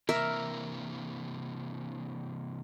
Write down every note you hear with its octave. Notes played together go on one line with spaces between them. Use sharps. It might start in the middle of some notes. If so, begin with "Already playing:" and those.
C3 E3 A#3 A#4 E5